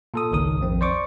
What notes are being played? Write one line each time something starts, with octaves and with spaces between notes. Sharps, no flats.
A#2 A4 D#6
G#1 C#2 D#3 A#4 D#6
A#1 F2 C4
C5 D5 C#6 D6